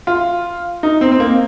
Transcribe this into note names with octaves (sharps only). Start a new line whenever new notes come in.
F4
D#4
C4
C4
A#3